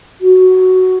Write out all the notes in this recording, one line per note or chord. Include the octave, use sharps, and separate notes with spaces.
F#4